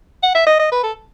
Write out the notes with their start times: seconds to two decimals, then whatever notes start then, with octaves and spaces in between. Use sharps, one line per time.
0.23 F#5
0.35 E5
0.47 D#5
0.59 D#5
0.72 B4
0.83 A4